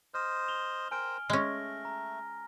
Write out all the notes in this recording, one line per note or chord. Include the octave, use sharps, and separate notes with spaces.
C5 D#5 F6
F7 G7
A#4 C5 G5 G#5 F6 D7
G#3 A3 C#4 A#6
A#5